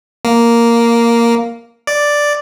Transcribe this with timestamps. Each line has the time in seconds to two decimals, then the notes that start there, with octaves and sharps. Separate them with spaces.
0.25 A#3
1.87 D5